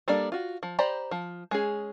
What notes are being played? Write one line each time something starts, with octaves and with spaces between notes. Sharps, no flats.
G3 A#3 D4 A4 D5
F4 F#4
F3
G4 C5 D5 A#5 B5
F3
G#3 C#4 G#4